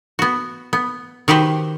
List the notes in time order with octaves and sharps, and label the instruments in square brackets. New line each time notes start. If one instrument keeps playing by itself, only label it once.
[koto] B3 F#4
B3
D#3 F#4 G4 B4 C5